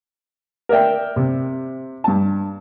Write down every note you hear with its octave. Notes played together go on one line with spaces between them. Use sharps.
A#4 D5 E5 G5
C3
G2 A5